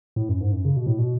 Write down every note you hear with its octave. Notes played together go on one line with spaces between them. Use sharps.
A2
F#2
G#2
F#2
C#3
B2
A2
B2